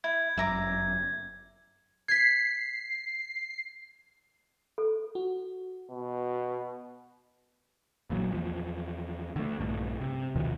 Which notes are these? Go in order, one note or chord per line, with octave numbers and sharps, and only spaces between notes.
E4 G#6
G1 F#2 E5 A#5 D6
G#6 B6 C7
A4
F#4
B2
A1 A#2 F#3
E2 F3
D3 A3
A#1 G2 A3
C3
D2 B2 D#3 F3